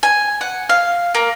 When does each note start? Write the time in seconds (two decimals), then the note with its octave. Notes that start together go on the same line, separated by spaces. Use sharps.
0.03 G#5
0.41 F#5
0.69 F5
1.15 A#3